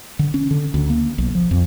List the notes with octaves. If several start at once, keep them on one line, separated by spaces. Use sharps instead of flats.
D3
C#4
D3
D2
A#3
B1
F3
F2